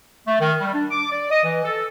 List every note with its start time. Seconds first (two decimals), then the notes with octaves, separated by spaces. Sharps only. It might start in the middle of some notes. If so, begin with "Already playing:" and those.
0.27 A3
0.40 D#3
0.60 G3
0.74 D4
0.90 D6
1.11 D5
1.31 D#5
1.44 E3
1.64 A4